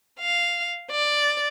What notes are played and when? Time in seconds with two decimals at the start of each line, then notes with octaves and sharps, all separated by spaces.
0.20 F5
0.91 D5